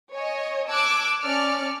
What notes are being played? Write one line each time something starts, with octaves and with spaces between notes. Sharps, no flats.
C#5 D#5 G#5
A5 D6 E6 F#6 G#6
C#4 D5 A5 F6 C#7